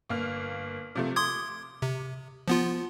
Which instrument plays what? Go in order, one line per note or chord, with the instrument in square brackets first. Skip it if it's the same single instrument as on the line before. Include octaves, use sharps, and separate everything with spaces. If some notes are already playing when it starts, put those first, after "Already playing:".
[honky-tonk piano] G1 A#3 F6
C3 F3 A3
[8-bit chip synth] C6 D#6 G#6 [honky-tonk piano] D6
[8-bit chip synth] C3
F3 B3 F4